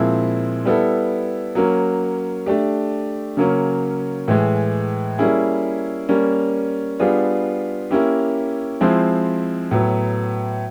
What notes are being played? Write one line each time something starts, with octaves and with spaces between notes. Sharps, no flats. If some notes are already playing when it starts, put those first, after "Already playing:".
Already playing: A#2 F3 G#3 C4 E4
G3 B3 E4 A4
F#3 A#3 C#4
A3 D4 G4
C#3 F#3 A#3 C#4
A2 E3 G#3
G3 A#3 C#4 E4 G#4
G3 A#3 C#4
G3 B3 D4 F4 G#4
A#3 C#4 E4 G4
F3 G#3 C4 E4
A2 F#3 B3